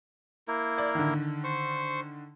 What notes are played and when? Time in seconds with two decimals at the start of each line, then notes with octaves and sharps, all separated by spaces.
0.48 A#3 E4 A#4
0.78 D5
0.95 D3 D#3
1.44 C5 C#6